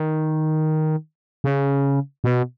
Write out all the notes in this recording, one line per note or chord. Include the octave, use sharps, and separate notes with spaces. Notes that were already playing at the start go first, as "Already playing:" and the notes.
Already playing: D#3
C#3
B2